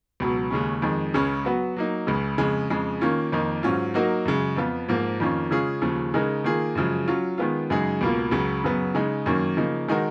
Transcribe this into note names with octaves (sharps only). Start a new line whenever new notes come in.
C#2 B2 F#3
D#2 C#3 G#3 C#4
F2 D#3 G#3
C#2 C#3 G#3 C#4
F#3 B3 F#4
F#3 A#3 D#4
C#2 C#3 G#3
F2 C#3 G#3
F2 C#3 G#3
D#3 A#3 C#4 F4
F2 D#3 A#3 D#4
G#2 F#3 C#4 F4
F#3 A#3 D#4 F#4 A#4
F#2 C#3 G#3
F2 F3 B3 F4
G#2 F3 A#3
F2 D#3 A#3 C#4 F4
C#3 G#3 C#4 F4 G#4
D#2 C#3 F3
C#3 G#3 D#4 A#4
D#3 A#3 F4 G#4
F#2 C#3 F3 G#3
F#3 C#4 F4
D#3 G#3 B3 F4
F#2 C#3 G#3 D#4 G#4
C#2 B2 A#3 F4
C#2 C#3 F#3
F#2 C#3 F#3 B3
C#3 G#3 D#4
F#2 D#3 A#3 C#4
C#3 F3 A#3 D#4
D#3 G#3 D#4 F#4 A#4